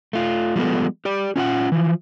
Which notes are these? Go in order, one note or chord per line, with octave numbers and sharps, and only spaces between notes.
A3 F4
F3 G3 G#3 B3 A4
G4 D5
C#4 F4 F5 F#5
E3 F3